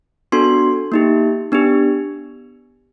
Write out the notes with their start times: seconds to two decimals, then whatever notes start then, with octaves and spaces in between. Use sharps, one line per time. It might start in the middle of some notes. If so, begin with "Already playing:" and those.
0.32 B3 D4 F#4 A4 C6
0.92 A#3 D#4 G4
1.52 B3 D4 G4